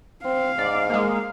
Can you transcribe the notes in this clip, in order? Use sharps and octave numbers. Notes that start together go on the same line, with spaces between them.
C4 F5
G#2 D5
G#3 A#3